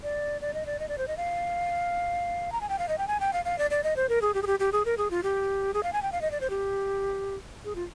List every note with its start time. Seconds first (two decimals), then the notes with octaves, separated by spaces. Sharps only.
0.03 D5
0.41 D5
0.54 D#5
0.66 D5
0.79 D#5
0.88 D5
0.98 C5
1.08 D#5
1.17 F5
2.52 A#5
2.61 G#5
2.69 G5
2.79 F5
2.88 D#5
2.98 G5
3.08 G#5
3.20 G5
3.33 F5
3.45 F5
3.58 D5
3.71 D5
3.84 D#5
3.96 C5
4.09 A#4
4.22 G#4
4.34 G4
4.42 G#4
4.47 G4
4.59 G4
4.72 G#4
4.85 A#4
4.98 G#4
5.11 F4
5.23 G4
5.74 G#4
5.83 F5
5.93 G#5
6.02 G5
6.12 F5
6.21 D#5
6.31 D5
6.41 C5
6.50 G4
7.65 G#4
7.75 F4